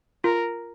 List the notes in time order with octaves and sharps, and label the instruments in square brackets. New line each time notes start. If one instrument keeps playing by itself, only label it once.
[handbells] F4 [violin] A#4